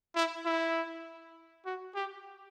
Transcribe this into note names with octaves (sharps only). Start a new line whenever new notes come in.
E4
E4
F#4
G4